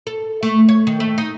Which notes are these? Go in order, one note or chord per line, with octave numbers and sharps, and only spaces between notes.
A4
A3
C#5
D#3
A3
D#4